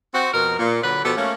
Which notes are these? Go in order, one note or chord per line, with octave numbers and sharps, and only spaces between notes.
C4 F#4
F2 B2 A#4
A#2
D3 F#3 B4
B2 F3 G4 A4
A3 A#3 C#4